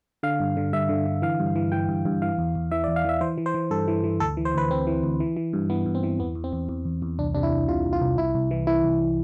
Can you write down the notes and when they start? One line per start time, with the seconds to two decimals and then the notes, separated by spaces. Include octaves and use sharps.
0.23 D3 F5
0.40 G2
0.57 D3
0.73 G2 E5
0.89 D3
1.06 D3
1.22 E3 F5
1.39 G2
1.56 E3
1.72 E3 G5
1.88 G2
2.05 G2
2.22 E3 F5
2.38 E2
2.55 E2
2.71 E3 E5
2.84 D5
2.88 E2
2.96 F5
3.05 E3 E5
3.21 E3 C5
3.38 E3
3.46 C5
3.54 E3
3.71 G2 A4
3.88 E3
4.04 E3
4.20 D2 A4
4.37 E3
4.45 C5
4.54 D2 B4
4.70 D2 C4
4.87 E3
5.04 D2
5.20 E3
5.37 E3
5.53 G2
5.70 E3 B3
5.86 G2
5.95 C4
6.03 E3
6.19 E2 B3
6.35 E2
6.44 C4
6.53 E2
6.69 E2
6.85 E2
7.02 E2
7.19 C2 D4
7.35 C3 D4
7.43 E4
7.52 C2
7.68 C3 F4
7.85 C2
7.93 F4
8.01 C2
8.18 C2 E4
8.35 C2
8.51 E3
8.67 E3 E4
8.84 C2